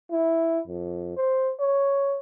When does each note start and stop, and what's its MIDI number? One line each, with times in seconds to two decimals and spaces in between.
0.11 0.59 64
0.67 1.13 41
1.17 1.52 72
1.60 2.19 73